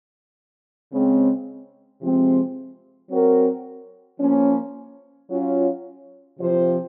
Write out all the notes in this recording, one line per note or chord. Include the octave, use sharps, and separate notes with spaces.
C#3 G#3 C4
C3 F3 G#3 C4
F#3 C4 F#4 A#4
F3 A#3 C#4
F#3 C#4 F4
C3 F3 C4 F4 C5